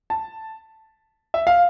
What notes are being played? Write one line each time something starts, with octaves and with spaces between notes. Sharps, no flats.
A5
E5
F5